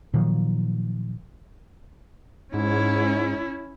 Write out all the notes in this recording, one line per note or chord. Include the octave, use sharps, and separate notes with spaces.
A#2 D#3 F3 F#3
G#2 C#4 E4